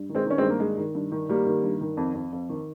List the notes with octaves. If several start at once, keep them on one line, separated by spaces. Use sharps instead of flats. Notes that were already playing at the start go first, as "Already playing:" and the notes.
Already playing: G2
D#3
G#3 C4
D#3 C#4
G#3 C4
G2
A#3
D#3 G#3
D#3
G2
D#3
D#3 G3 A#3
D#3
G2
D#3
F2
F2
F2
D#3